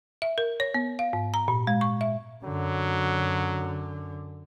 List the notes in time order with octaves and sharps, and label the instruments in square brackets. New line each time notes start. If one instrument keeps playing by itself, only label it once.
[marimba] E5
A#4
C#5
B3
F5
G#2
A#5
A#2
G#3
C#6
E5
[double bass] F#2 D3 [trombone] F#3